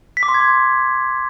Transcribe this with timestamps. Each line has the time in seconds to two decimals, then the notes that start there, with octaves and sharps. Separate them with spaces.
0.17 B6
0.23 D6
0.29 C6
0.34 G#6
0.40 C6